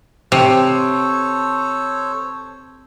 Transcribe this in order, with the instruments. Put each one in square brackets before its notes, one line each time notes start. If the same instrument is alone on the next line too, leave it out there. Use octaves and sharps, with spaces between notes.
[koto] C3 [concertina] A4 C5 C#5